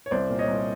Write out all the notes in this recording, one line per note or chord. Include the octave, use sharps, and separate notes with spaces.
C#5
C2 C5 D5
A#2
C#5 D#5
C2